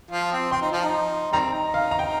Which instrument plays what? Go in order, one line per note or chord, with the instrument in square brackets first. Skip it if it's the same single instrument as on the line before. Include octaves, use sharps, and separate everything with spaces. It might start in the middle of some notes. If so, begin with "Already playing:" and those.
[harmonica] F3 F4
C4
[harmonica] C4 [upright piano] C6
[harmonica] D#4
F3 F4
D#4
[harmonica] D#3 G3 C4 [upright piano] A#5
[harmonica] D#4
[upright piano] F5
A#5
G5